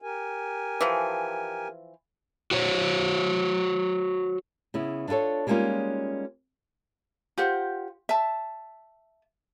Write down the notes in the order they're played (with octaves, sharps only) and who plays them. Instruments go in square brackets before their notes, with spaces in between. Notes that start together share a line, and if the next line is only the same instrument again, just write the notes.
[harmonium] G4 A#4 G#5
[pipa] E3 F3
[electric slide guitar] F#4 C5 C#5
[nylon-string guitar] C#3 B3 E4
D4 E4 F4 A4 C#5
G3 G#3 A#3 C#4 D#4 F4
[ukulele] F4 G4 C5 F#5
E5 A5